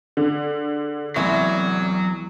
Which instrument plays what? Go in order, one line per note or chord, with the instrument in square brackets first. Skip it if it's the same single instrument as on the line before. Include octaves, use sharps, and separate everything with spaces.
[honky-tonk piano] D3 [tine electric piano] G#4
[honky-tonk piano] C2 [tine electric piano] E3 G#4 [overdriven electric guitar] F#3 [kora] G#3 B3 E4